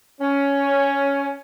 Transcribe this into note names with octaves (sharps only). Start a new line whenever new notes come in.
C#4